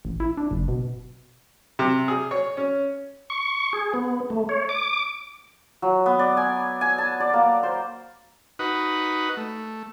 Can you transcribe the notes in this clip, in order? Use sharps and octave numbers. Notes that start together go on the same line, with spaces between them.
A1
E4
D4
F#1
B2
C3
G#4
C#5
C#4
C#6
G#4
B3
A3
C#5
D6
F#3
B3
D5
G#5
G#5
A5
D5
A#3
C5
D#4 F#4 B4
A3